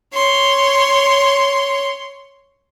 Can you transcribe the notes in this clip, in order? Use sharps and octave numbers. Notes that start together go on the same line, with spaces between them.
C#5 C6